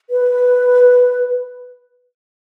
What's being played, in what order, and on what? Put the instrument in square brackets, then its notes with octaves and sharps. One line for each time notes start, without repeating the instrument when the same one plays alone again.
[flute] B4